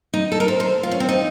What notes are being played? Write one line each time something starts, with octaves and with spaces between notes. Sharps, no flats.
D#4
A4
A#4
C5
C5
F4
C#4
C4
D#4